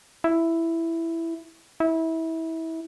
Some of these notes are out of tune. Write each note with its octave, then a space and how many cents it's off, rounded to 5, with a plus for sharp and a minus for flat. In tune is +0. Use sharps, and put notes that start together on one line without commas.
E4 +5
E4 -25